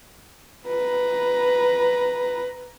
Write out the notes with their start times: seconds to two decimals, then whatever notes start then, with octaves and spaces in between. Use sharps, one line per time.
0.67 B4 A#5